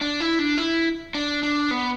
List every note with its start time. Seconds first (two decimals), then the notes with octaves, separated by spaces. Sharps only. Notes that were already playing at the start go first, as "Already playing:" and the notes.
0.01 D4
0.20 E4
0.39 D4
0.58 E4
1.15 D4
1.43 D4
1.71 B3